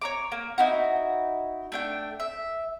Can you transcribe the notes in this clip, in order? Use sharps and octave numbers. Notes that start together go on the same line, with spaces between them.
C#5 A#5 D6
A#3
D#4 E4 F#4
A3 D4 G5
E5